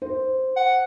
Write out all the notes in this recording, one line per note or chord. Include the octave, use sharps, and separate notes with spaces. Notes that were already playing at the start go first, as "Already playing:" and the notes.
C5
F#5